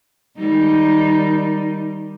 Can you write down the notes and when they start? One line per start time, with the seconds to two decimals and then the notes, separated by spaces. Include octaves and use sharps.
0.38 D#3 G3 D#4